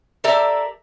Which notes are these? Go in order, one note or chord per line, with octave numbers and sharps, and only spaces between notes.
G4 A4 A#4 D5 E5